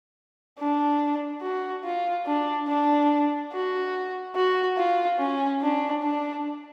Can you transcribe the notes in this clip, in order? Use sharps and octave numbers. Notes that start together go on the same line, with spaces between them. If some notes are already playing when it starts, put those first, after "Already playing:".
D4
F#4
F4
D4
D4
F#4
F#4
F4
C#4
D4
D4